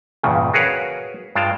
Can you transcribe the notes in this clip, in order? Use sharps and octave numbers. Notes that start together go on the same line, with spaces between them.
E2 G2 A#2 C#3
F#4 G#4 A#4 B4 C#5 F5
G2 G#3 F4 F5 G5 A5